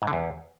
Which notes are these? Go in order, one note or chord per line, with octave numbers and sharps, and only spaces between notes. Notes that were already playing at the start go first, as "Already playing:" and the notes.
G#2
D3
E2